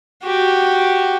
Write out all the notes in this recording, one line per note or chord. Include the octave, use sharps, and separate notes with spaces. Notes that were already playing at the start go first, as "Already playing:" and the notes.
F#4 G4